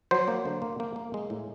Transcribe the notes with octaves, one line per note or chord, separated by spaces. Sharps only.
F#3 C5
A#3
D3
A#3
A#3
A#3
G#3
A2